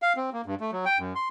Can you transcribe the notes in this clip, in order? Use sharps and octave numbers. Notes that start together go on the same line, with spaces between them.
F5
C4
A#3
G2
A3
F#3
G5
F#2
C6